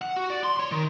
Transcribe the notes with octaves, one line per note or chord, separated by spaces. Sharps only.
F#5
F#4
D5
C6
C#5
D#3